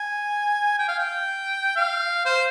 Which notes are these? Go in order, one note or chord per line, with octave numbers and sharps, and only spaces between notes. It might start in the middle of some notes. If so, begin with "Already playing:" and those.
Already playing: G#5
G5
F5
G5
F5
C5